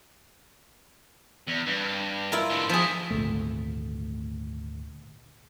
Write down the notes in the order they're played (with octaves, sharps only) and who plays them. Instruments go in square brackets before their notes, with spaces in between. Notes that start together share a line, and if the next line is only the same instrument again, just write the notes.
[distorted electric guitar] E2
G2
[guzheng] E4 F4 A#4
[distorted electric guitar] G#2 D3
[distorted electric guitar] D#3 E4 [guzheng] F3 G#4
[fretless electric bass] G#1 D2 A#2 A3